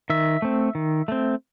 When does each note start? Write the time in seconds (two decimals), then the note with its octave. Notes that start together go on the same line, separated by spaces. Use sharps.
0.10 D#3 E5
0.42 A3 C4
0.75 D#3
1.08 A3 C4